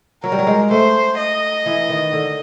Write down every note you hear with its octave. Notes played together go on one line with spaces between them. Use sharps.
F#3 A#4
G3
F#3
G#3
A3 C5
D#5
E3
D#3
D3